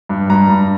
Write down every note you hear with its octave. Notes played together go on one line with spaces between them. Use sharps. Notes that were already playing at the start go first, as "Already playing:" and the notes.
G2
G2 A#5
G2